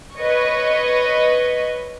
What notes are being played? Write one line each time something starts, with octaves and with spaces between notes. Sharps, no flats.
B4 C#5 D#5 C#6